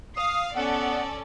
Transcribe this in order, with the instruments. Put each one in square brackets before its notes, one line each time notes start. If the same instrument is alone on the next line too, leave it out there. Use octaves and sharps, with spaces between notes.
[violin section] F5 C7 [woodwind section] D#6
[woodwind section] B3 F#5 [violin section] C#4 A4 D5